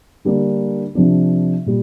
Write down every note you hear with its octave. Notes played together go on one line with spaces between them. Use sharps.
D3 G3 A#3 D4
C3 F3 D4
A#2 G3